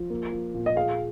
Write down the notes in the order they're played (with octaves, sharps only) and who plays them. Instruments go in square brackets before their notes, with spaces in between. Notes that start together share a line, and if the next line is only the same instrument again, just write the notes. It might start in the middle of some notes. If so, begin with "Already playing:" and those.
Already playing: [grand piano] F3
A#3
F3
A#2
[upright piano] D#5
[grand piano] G#4 [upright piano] F5